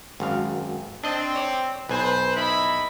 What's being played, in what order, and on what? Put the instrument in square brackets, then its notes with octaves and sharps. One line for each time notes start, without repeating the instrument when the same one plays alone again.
[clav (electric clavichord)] G#1 F#2 F5
[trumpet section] C4 [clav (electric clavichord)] D4 D#5
[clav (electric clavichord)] C#5 D5
[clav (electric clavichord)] B1 G#5 [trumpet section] B4 C5
[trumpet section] D#4 E4 B5